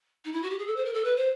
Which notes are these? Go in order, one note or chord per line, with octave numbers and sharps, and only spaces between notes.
D#4
E4
F#4
G4
G#4
A4
C5
A#4
A4
B4
C5